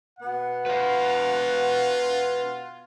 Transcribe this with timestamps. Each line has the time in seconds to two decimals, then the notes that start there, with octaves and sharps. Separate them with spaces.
0.19 B2 B3 F#5
0.66 F4 B4 F5